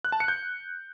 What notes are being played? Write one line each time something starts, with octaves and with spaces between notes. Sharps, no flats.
F#6
A5
C#7
G6